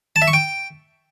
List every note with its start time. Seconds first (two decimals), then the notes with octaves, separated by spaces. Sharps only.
0.16 A5
0.22 E5
0.28 C#6
0.33 G5